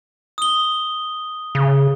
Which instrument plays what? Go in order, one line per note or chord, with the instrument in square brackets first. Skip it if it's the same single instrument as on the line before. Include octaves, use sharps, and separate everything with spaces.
[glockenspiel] D#6 G7
[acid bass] C#3